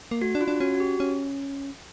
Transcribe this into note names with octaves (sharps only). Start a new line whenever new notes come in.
A#3
A3 F#4
D4
F4
D4
C#4 F#4
F#4
G4
C#4